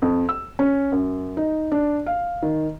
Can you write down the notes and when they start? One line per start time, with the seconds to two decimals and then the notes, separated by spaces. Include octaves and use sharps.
0.02 F2
0.29 E6
0.59 C#4
0.92 F#2
1.37 D#4
1.72 D4
2.06 F5
2.42 D#3